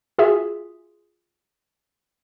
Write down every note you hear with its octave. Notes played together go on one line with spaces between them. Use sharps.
F4 F#4 G#4 E5